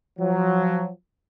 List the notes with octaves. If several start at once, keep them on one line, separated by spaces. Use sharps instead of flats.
F3 F#3